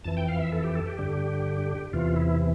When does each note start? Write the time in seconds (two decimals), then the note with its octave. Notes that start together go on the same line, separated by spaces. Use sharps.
0.04 F2 E3 A5
0.17 G5
0.28 F5
0.40 E5
0.52 A4
0.64 G4
0.75 A4
0.87 G4
0.99 G2 D3
1.93 E2 C3 E3 F4
2.16 E4